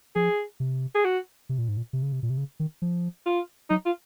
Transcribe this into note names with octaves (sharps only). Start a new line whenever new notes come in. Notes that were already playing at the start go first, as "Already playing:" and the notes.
F3 G#4
C3
G#4
F#4
C3
A#2
G#2
A#2
C3
C#3
C3
A#2
C3
C#3
D#3
F3
F4
F#3 D#4
F4